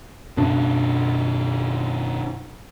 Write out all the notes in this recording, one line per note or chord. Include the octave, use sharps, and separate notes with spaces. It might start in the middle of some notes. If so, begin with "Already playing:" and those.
F#2 B2 D4